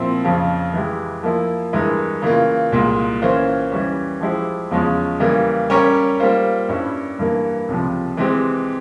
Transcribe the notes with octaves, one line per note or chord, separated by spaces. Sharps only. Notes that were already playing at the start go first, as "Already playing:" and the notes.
Already playing: A#2 F3 C4 E4
F2 C#3 F3
E3 G#3 E4 G4
F3 A#3 E4
G2 E3 G#3 E4 A#4
C#3 E3 A#3 F4
C2 A#2 G#3
E3 A#3 C#4 F4 C5
E3 G3 C#4
F3 G#3 E4 G4 C5
E2 C#3 F3 G#3 C#4
C#3 E3 G3 A#3
G3 C#4 G4 A#4 C#5
G3 A#3 F4 C5
G2 G3 C#4 E4
G2 E3 A#3
C#2 C3 F3
E3 G#3 C4 G4